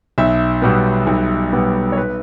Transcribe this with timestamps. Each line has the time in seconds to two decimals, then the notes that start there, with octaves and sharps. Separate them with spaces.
0.18 B1 E5
0.62 B2 G3 B3
1.07 B1
1.53 B2 G3 B3
1.92 C#5
1.97 B4